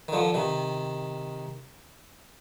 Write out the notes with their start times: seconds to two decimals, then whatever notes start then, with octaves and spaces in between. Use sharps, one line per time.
0.08 D#3
0.12 D3 F3
0.34 C3 D#3